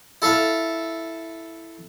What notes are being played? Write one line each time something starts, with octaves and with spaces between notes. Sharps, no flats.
E4 A4 E5 F5